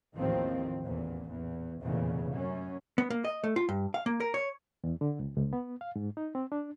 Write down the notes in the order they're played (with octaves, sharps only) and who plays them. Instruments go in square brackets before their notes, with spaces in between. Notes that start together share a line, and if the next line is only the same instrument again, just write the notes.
[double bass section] A1 D#2 A2 D#3 F3 C4
A1 E2 A#2
E2
F1 E2 A#2 C#3
F#2 C#4
[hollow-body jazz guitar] B3
A#3
D#5
A3
F4
G2
F5
A#3
A#4
C#5
[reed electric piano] E2
D3
C#2
C#2
B3
F5
G#2
D#4
C4
D4